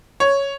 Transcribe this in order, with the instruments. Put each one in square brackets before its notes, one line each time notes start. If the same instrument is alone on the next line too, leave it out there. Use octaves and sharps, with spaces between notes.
[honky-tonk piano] C#5